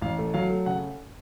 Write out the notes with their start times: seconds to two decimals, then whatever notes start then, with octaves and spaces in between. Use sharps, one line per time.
0.02 A1 F5
0.19 A3
0.34 F#3 F5
0.50 A3
0.66 C#3 F#5